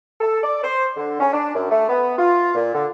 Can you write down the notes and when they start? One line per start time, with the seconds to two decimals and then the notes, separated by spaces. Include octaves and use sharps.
0.21 A4
0.43 D5
0.63 C5
0.97 D3
1.20 C#4
1.33 D4
1.55 F#2
1.71 A3
1.89 B3
2.18 F4
2.55 A#2
2.74 D3